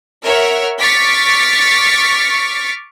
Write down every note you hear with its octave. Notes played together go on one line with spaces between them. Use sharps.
A#4 C#5 E5 F#5 F6
C#6 D6 F6 A6 B6 C#7